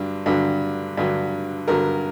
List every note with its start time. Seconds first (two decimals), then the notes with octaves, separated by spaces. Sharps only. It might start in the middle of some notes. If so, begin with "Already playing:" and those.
Already playing: G2 D3 F#3
0.26 G2 D3 F#3
0.97 G2 D3 F#3
1.68 G2 D3 F#3 A#4